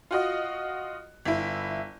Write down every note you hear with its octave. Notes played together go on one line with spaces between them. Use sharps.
F4 F#4 D#5
G1 E4